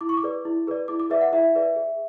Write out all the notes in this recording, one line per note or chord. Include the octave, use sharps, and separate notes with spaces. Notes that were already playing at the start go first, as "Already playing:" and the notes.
E4 D6
C#6
D6
G#4 B4 D5
E4
G#4 B4 D5
E4 D6
D6
G#4 B4 D5 E5
F#5
E4 E5
G#4 B4 D5
G#4